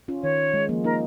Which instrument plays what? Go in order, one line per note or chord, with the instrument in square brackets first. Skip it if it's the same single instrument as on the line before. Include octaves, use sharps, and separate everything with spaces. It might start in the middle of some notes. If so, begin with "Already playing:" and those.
[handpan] C#4 F4
[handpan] D#3 [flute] C#5
[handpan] G#3
F3 A#3
[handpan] A#3 D#4 [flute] A#4